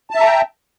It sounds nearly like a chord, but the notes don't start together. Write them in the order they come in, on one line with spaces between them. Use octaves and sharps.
A5 E5 A#5 G5